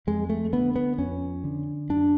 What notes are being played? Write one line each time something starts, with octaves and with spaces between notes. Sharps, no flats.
F2 G#3
A3
D3 B3
B3
F2 C#4
D3
F#2 D4